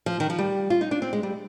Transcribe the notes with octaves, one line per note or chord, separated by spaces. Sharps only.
F3
D#3
F3
G3
F4
D#4
D4
C4
G#3
G3